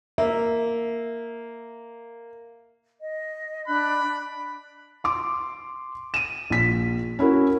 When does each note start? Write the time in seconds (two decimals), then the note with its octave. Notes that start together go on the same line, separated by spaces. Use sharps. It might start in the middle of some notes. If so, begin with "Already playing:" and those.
0.18 A#3 E5
3.00 D#5
3.68 D4 B5 F#6
5.04 C6 D6
6.14 D#7 E7
6.50 A#1 B6
7.19 C#4 E4 F#4 A#4